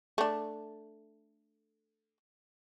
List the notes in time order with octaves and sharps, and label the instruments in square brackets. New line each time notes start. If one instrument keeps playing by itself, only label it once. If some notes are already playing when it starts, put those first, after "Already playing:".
[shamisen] A3 D4